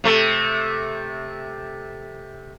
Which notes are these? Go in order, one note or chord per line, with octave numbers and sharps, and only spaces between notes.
C3 A3